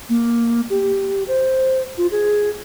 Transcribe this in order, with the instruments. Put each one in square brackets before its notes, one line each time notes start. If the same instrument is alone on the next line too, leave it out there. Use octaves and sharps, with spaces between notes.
[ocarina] A#3
G4
C5
F4
G#4